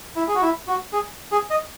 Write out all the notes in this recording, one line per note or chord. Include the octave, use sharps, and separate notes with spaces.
E4
G#4
F#4
E4
F#4
G#4
G#4
D#5